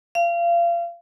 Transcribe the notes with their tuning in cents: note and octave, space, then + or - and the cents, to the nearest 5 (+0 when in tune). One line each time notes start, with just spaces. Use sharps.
F5 -30